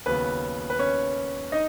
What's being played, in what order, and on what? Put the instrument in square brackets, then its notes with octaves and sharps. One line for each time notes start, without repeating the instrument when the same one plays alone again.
[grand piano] D#2 C#3 F#3 B3 B4
B4
C#4 C#5
D#4 D#5